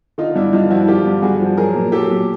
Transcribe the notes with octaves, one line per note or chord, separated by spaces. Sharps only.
D3 D#4 F4
G2 D4 E4
G2 D#4 F4
F3 E4 F#4
D3 F4 G4
G2
G2 F#4 G#4
F3
F#3 G#4 A#4
A#2
F#3 G4 A4
A#2